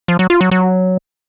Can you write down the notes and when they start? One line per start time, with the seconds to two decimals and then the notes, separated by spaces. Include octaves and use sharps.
0.08 F3
0.19 F#3
0.30 F4
0.41 F#3
0.51 F#3